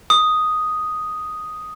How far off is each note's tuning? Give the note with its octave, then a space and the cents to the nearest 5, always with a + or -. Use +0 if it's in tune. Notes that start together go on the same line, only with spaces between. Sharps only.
D#6 +0